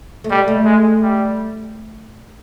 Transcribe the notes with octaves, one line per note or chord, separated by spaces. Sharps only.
A3
G3 G#3
A3
G#3
G3